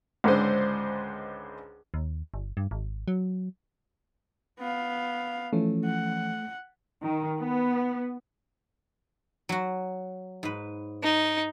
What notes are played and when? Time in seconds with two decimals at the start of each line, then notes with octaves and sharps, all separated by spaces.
0.24 C#2 G#2 D3 C5
1.94 D#2
2.34 G1
2.57 G2
2.71 G#1
3.08 F#3
4.60 B3 F5
5.53 E3 F3 A3 C#4
5.85 F#5
7.03 D#3
7.41 B3
9.49 F#3 F#4
10.43 G#2 B4
11.03 D#4